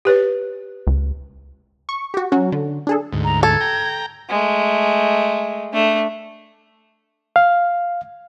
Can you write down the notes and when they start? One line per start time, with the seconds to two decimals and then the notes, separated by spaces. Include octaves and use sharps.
0.05 G4 B4 C#5
0.87 C#2
1.89 C#6
2.14 F#4 G4
2.32 F#3 C#4 F#4
2.52 D3
2.87 D4 G#4 A4
3.13 D2 G#2
3.24 A#5
3.43 A4 G#6
3.61 G5 A#5
4.29 G#3 A3
5.73 A3 D4
7.36 F5